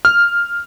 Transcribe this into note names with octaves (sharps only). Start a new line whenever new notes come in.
F6